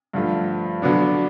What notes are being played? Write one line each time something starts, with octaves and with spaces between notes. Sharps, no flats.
G2 D3 F3 A3
D3 F#3 B3 D4